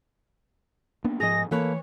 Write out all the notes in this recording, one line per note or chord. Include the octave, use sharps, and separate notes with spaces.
A#3 B3 D4
G#2 F3 G#4 D#5 A#6
E3 A#3 A4 B4 C#5